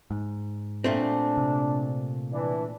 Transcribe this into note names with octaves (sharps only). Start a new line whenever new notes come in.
G#2
A#2 A3 C4 D4
C3
E3 D4